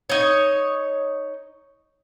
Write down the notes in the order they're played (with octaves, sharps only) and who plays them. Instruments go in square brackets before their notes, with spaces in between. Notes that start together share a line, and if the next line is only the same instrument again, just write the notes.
[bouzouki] D#4 C#5